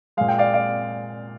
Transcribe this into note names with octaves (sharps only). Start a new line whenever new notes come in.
A#2 G#3 F5
G5
D5 F5
D5 F5